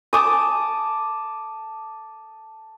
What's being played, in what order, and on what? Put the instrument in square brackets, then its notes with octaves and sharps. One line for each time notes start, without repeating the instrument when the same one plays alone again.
[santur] A5 D6 D#6